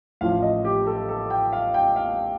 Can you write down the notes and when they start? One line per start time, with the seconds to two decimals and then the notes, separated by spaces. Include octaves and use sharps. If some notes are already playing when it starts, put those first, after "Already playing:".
0.21 A1 A2 F3 F5
0.42 D#5
0.65 G4
0.87 A4
1.09 A4
1.30 G5
1.53 F5
1.74 G5
1.96 F5